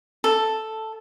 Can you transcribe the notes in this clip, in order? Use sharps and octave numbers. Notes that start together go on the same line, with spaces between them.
A4